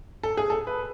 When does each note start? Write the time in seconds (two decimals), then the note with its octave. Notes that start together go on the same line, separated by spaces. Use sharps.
0.23 A4
0.37 G#4
0.50 A4
0.67 B4